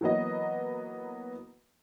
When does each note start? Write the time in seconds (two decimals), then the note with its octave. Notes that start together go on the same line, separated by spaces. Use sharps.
0.01 E3 F#3 A#3 B3 D#5